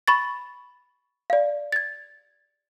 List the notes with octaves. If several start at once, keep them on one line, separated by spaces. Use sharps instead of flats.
B5 C#6 A6
D5 F5
G#6 A6